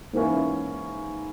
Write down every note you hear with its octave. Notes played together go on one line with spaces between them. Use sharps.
G#2 E3 A#3 C#4 E4